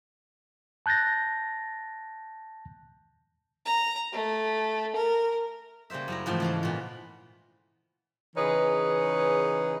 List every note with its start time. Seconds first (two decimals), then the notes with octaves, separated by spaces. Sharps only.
0.86 A5 F#6 G6 A6 A#6
3.66 A#5
4.12 A3
4.96 A#4
5.90 C#3 G3 A#3 C5 E5
6.08 F#2 E4 A#5
6.26 G#2 E3 F3 G#3 A3 C4
6.40 C#3 E3 F5
6.63 A#2 B3
8.36 C#3 E3 D#4 G#4 B4 C#5